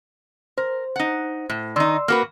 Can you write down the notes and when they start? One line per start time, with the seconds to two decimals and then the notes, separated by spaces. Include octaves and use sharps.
0.58 A#4 C5
0.96 D#4 F#5
1.50 A2
1.76 D#3 D#4 D5 C6 E6
2.08 A#3 F#4 A#4 B4 F6